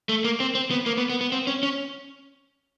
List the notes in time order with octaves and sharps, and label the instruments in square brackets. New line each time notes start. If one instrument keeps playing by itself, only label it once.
[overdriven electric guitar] A3
A#3
C4
C4
B3
A#3
B3
B3
B3
C4
C#4
C#4